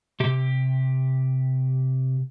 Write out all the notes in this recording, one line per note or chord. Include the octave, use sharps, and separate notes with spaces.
C3 G4